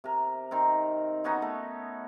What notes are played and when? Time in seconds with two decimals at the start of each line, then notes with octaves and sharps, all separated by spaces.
0.04 C3 A#4
0.51 D#3 C4 A#4
1.24 B3 C#4 D#4 F#4
1.42 A3